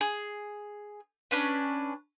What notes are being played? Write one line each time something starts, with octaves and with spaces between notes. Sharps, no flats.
G#4
C#4 D4 B4